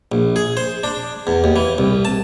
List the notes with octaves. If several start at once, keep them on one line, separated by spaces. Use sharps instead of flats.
A#1
G#4
C5
D4
E2
D#2
E3
C2
A5